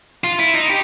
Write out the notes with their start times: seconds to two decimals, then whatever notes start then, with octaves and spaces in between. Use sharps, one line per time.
0.24 F4
0.39 E4
0.55 D#4
0.70 G4